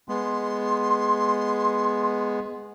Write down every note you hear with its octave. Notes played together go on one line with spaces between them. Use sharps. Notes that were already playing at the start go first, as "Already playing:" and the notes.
G#3 B3 C6